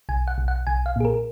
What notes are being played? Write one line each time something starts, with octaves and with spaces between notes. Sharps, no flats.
B1 G#5
F#5
B1
F#5
B1 G#5
F5
A#2 G#4
A#4